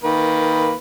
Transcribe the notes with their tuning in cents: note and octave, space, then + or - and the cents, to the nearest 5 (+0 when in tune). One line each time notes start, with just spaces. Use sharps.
D#3 +20 A#3 +0 B4 +0